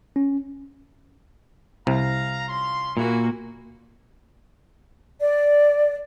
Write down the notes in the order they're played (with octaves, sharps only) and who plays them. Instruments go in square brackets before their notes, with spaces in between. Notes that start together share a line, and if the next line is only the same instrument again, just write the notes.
[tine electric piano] C#4
[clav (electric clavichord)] C2 C3 [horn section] F5 A#5
[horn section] C#4 F4 C6
[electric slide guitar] A#2 [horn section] E3 E4 [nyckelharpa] A#3 F#4
[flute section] D5